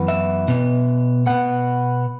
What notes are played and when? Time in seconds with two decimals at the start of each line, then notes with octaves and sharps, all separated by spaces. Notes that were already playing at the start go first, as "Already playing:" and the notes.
Already playing: F#2 E3 B3
0.08 E5
0.48 B2 B3
1.26 B2 B3 F#5